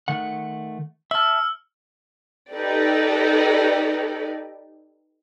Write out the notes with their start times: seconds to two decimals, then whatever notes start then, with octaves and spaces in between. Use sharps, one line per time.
0.08 D#3 A3 F#5
1.11 E5 A5 E6 F6
2.52 D#4 G4 A4 B4 D5